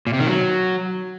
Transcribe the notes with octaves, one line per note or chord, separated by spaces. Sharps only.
A#2
C3
D#3
F#3